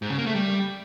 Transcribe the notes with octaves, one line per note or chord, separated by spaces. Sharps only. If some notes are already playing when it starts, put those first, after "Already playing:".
G#2
C#3
A#3
A3
G3